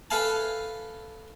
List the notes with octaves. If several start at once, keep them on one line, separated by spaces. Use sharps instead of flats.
A4 B4 E5 F5 G#5 A5